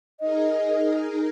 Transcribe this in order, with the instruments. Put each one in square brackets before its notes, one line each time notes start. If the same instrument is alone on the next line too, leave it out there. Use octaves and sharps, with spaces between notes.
[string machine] D#4 G#4 A#4 [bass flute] D#5